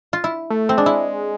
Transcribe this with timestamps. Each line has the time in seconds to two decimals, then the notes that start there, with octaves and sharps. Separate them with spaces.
0.13 F4
0.24 E4
0.50 A3
0.69 C4
0.77 G#3 D4
0.86 E4